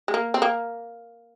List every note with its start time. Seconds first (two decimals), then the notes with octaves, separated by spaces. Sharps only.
0.08 G#3
0.14 A#3
0.34 C4
0.42 A#3